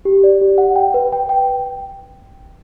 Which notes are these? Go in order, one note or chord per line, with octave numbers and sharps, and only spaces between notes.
G4
D5
G4
F#5
G5
B4
G5
G5